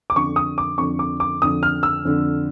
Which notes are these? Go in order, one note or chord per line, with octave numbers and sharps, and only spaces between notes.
D6
F2 D3 C#6
D#6
D6
F2 D3 C#6
D6
D6
F2 D3 D#6
F6
E6
F2 D3